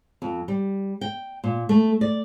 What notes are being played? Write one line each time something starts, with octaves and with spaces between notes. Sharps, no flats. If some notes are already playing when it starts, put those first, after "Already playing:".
F2
G3
G5
A#2
A3
D5